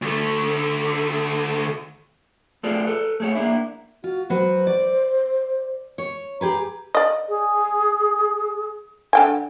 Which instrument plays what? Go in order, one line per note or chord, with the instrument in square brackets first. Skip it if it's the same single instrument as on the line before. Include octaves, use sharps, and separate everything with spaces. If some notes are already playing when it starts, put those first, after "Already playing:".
[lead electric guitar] D2 A3
[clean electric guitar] A3 F4 G#4 A4 B4 D5
A4 B4
A3 G#4 C#5
A#3 D4 E4
[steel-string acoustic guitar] F4 [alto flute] F#4
[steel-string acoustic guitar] F#3 F#4 B4 [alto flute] C5
[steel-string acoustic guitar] D5
C#5
[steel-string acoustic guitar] G4 G#4 B4 [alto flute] A#5
[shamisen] D5 D#5
[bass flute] G#4
[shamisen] D3 G5 G#5